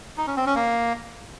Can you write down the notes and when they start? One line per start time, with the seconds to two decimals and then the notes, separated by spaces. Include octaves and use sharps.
0.17 D#4
0.27 C#4
0.36 C4
0.46 C#4
0.56 A#3